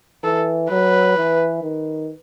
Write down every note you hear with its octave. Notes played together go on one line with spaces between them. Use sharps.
E3 A4
F#3 B4
E3
D#3